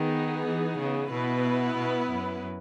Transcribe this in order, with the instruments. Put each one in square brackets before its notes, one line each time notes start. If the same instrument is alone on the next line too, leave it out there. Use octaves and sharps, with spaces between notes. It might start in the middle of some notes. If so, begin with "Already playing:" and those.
Already playing: [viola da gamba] D#3 [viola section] B3 D#4 G#4
[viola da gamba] E3
C#3
[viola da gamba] B2 [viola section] B3 E4 B4
[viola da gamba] B2
F#2